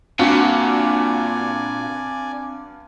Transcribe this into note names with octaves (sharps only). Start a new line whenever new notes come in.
G2 A#2 C4 F#4 D5 G#5